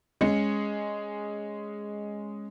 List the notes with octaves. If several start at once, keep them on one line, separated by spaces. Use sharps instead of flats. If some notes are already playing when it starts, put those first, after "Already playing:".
G#3 C#4 G#4 C#7